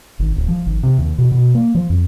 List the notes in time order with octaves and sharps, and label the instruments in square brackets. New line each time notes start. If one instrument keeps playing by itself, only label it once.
[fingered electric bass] G#1
D1
F3
G#1
C3
D#2
B2
B2
A#3
F3
F2